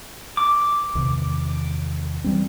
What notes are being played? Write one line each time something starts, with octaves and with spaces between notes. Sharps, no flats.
D6
E2 C3 D#3
E3 G3 C4